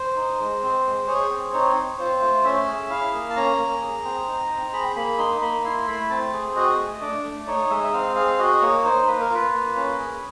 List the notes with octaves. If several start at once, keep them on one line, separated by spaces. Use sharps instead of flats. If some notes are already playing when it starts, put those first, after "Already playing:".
Already playing: C5
D#4
G#3
C4
G#3
G#4 C#5
C4
D#4 C#5
C4
F4 C5
A3
C#4 E5
G#4
E4 F5
A#3
A5
C#4 A#5
A#3
G#4
C4
D#4
C4
G#4 B5
A#3 B5
D#4 C6
A#3 B5
E4 C6
A3 B5
C4 A5
G#4
F#4 D#5
A3
D4 D5
A3
D#4 C#5
G#3 E5
E5
C4 F5
G#4 F5
F#4 D#5
A#3 C#5
D#4 C5
A#3 B4
A#4
F4 B4
A#3
C#4
G#4